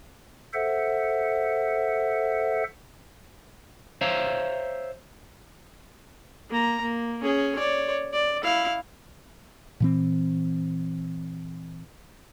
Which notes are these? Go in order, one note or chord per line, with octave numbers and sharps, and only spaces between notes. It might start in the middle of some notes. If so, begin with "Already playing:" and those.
A4 C5 E5 F#5
C5 C#5 E5 F5 A#5
A#3 A#5
A#3
C#4 G#4
C#5 D5
D5
E4 F5
A#2 E3 C4